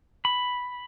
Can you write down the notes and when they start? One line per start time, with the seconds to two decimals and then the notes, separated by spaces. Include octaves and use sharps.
0.25 B5